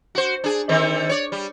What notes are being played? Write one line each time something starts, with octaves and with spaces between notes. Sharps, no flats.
F#4 C5
D4 G#4
D3 D#3 C4
C#5 D5
G3